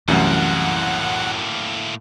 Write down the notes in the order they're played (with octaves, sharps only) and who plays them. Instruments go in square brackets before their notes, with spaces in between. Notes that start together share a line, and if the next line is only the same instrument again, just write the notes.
[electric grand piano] C2 F#2 [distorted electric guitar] A2 A#3 [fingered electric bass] E3 A3 C#4 [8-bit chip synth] F#5